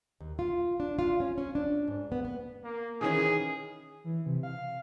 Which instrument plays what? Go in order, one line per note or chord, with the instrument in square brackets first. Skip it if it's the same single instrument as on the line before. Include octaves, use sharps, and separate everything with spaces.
[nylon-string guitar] D#2
F4
D4
F4
C#4
C#4
D4
G#2
B3
B3
[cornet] A#3
[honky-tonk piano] D#3 E3 C#4 [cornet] G#4
[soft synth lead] E3
C3
F5